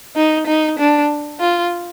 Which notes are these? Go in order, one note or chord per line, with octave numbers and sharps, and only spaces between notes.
D#4
D#4
D4
F4